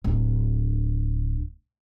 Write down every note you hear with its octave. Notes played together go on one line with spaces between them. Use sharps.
D1 D4